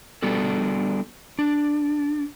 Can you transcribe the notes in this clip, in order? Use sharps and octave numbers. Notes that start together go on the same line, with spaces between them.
G3 B3 D4 F#4 A4
D4